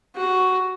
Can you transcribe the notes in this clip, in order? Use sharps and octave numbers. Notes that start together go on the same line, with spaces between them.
F#4